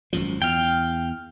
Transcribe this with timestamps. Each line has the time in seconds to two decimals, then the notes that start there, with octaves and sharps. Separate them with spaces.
0.13 G#1 F#2 F3
0.42 E2 F5 G5